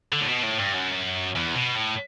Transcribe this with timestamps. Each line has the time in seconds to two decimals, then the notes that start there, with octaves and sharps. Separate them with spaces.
0.12 D3
0.20 A2
0.28 B2
0.43 A2
0.58 G2
0.74 F#2
1.36 E2
1.55 B2
1.76 A2